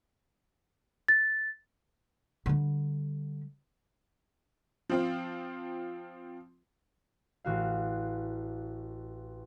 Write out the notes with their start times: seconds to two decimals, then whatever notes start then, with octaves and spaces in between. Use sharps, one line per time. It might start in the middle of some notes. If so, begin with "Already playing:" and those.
1.08 A6
2.46 D3 G3
4.89 F3 C4 F4
7.45 A1 F#4 F5